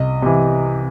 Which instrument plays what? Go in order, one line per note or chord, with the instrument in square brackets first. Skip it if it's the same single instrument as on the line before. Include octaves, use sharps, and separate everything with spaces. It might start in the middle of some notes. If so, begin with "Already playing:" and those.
Already playing: [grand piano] C2 D#5
C3 E3